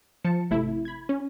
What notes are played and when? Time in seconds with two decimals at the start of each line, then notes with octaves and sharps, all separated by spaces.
0.24 F3 A5 C#7
0.50 G#1 C3 A3 E4
0.85 B5 G#6
1.09 C#4